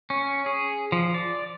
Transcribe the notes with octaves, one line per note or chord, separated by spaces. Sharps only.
C#4
G#4
F3
D5